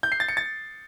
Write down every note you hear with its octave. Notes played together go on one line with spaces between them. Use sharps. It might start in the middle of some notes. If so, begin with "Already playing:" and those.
G6
C7
A6
C#7
A6